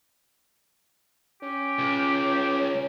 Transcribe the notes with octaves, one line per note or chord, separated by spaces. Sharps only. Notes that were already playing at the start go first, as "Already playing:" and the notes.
C#4 G4
C#2